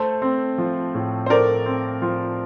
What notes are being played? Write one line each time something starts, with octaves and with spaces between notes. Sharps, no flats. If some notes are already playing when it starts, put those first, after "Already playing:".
Already playing: A3 A4 C5
C4
F3
A2
C5
A3 A#4 D5
C4
F3